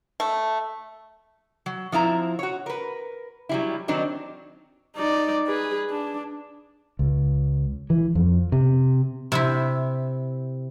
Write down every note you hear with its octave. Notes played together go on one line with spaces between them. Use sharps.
A3
F#3
F3 C4 E4 A#5
F#4 C#5
A#4 B4
F#3 G3 E4
D#3 F#3 C4 D4 D#4
D#4 D5
G#4 B4
D4
C#2
E3
F2
C3
C3 C4 E4